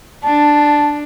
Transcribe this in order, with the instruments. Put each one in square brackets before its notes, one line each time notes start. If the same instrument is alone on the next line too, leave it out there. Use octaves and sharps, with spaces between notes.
[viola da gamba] D4 [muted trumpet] A5